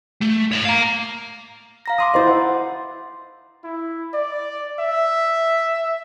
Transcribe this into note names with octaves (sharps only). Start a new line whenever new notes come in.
A3
C#5 E5
F5 A#5
F5 A#5 A#6
A#5 C6 D6 D#6
E4 C5 D#5 C6 A6
E5 F#5
E4
D5
E5